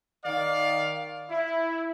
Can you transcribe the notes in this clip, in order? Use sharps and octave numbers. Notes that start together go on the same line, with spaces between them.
D#3 D5 F5
E4